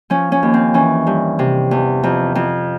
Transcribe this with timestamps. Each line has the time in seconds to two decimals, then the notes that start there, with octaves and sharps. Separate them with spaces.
0.10 F3 C#4
0.32 C#4
0.43 D#2
0.54 C4
0.74 E3 C#4
1.07 G2
1.39 C3
1.71 E2
2.03 F2
2.35 F2